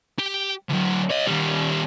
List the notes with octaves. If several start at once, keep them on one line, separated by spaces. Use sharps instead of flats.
G4
D2 F#3
C#5 D#5
D#2 G3